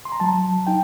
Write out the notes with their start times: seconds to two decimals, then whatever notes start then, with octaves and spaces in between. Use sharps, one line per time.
0.05 C6
0.12 A#5
0.20 F#3 A5
0.67 D#4 G5